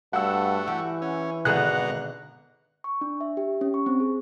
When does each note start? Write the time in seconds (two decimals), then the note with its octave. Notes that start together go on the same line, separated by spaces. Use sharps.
0.13 G2 A3 F#4 F#5 E6
0.68 E3 G4
1.02 C#4
1.45 G#1 B2 D3 B3 G#4 F#5 A#5 F#6
2.84 C#6
3.01 D4
3.21 E5
3.37 G4
3.61 C#4
3.74 C#6
3.86 C4
4.00 G#4